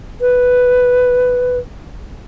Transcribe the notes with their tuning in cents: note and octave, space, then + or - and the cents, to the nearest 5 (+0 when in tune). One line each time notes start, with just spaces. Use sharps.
B4 +5